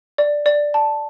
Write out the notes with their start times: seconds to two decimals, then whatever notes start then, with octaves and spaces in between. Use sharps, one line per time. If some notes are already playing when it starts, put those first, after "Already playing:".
0.18 D5
0.46 D5
0.74 A5